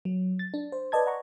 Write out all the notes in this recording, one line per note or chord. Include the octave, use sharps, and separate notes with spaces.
F#3
A6
D4
C5
B4 D5 D#5 A5 G#6
F#5 A#5 C#6